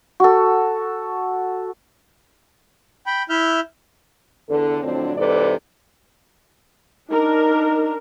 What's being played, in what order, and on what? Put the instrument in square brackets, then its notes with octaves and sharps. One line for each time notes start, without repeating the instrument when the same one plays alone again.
[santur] F#4 A4
[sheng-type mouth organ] G5 B5
E4 E5 F6 G6
[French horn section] E2 D3 A4
F2 A2 D3 F#3 C4 D4
G#2 C3 E3 A4 B4 D5
[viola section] D4 A#4 [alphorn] D#4